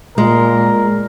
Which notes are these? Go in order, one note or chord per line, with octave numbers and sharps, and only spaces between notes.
A#2 G#3 A#4